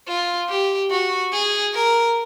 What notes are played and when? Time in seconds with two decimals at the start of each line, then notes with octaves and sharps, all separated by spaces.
0.08 F4
0.49 G4
0.90 F#4
1.33 G#4
1.75 A#4